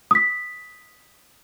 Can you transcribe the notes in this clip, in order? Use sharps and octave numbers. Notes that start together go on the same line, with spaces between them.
D#6 B6